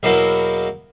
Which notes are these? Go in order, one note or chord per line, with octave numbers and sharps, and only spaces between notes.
E2 B2 F#3 A#3 E4